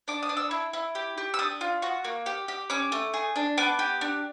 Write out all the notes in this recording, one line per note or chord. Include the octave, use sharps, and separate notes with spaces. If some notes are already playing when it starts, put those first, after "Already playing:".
D4 D6
D#6
D4
E6
E4
E4
G4
G4
E6
D4 D#6
F4
F#4
A#3
G4
G4
C#4 D6
A3
G#4
D4
B3 D6
G4
D4